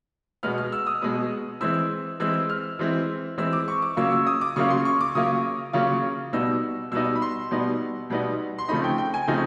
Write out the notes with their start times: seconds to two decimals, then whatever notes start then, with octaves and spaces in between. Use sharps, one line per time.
0.43 B2 G#3 B3 F6
0.58 F6
0.72 E6
0.87 D#6
1.02 B2 G#3 B3 D#6
1.61 E3 G#3 C4 E4 E6
2.20 E3 G#3 C4 E4 E6
2.49 F6
2.79 E3 G#3 C4 E4
3.38 E3 G#3 C4 E4 E6
3.53 D6
3.68 C#6
3.82 D6
3.96 C#3 F#3 A#3 C#4 F4 E6
4.12 E6
4.27 D#6
4.41 D6
4.56 C#3 F#3 A#3 C#4 F4 C#6
4.70 C6
4.85 C#6
5.01 D6
5.15 C#3 F#3 A#3 C#4 F4 D#6
5.73 C#3 F#3 A#3 C#4 F4
6.33 B2 G3 B3 D#4 E6
6.92 B2 G3 B3 D#4 E6
7.15 B5
7.22 C6
7.51 B2 G3 B3 D#4
8.10 B2 G3 B3 D#4
8.58 C6
8.68 C#3 F3 A3 C4 D#4 B5
8.84 G5
8.98 G5
9.14 G#5
9.28 C#3 F3 A3 C4 D#4